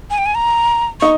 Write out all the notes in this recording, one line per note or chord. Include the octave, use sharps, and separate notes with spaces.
G#5
G5
G#5
A#5
D#4 C#6